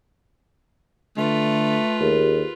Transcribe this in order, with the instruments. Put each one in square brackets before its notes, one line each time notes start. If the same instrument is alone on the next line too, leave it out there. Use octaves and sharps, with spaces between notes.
[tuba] D3 [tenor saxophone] A3 [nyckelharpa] F4 B4
[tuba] D#2 [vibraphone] G4 G#4 A#4